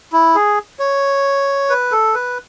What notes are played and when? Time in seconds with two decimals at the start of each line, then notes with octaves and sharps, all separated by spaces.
0.13 E4
0.35 G#4
0.79 C#5
1.70 B4
1.92 A4
2.15 B4